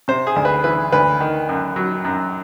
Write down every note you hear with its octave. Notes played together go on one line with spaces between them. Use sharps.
C3 C5
G#4
D2
B4
E3 B4
D2 B4
D#3
F#2
F#3
F#2